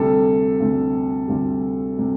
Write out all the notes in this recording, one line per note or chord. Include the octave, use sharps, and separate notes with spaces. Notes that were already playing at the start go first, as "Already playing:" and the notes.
Already playing: D2 C3 G3 A4
D2 C3 G3
D2 C3 G3
C3 G3